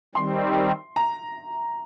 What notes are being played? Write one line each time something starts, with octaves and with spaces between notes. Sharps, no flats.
D#3 G3 C4 C6
A#5